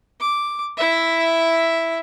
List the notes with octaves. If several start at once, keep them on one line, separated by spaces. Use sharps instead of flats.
D6
E4 E5